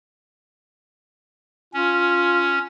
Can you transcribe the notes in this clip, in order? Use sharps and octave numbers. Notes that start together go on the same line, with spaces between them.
C#4 F4